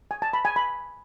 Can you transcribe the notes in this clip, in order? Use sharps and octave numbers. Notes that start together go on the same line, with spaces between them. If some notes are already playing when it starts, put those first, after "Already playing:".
G#5
A5
B5
G#5
B5